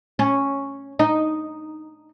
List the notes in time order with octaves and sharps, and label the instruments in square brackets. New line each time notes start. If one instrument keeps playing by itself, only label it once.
[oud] C#4
D#4